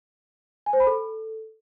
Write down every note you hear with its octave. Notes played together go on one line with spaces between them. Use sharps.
G#5
C5
B5
A4